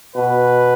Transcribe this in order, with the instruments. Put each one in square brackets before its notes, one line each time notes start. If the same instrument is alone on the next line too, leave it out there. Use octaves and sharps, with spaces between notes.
[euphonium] B2 [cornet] B4